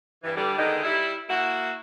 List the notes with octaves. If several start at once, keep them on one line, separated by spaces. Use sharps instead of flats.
G2 E3
D3 G3
D3 D#3 G#3 B3 D#4
G3 E4
A#3 E4 F#4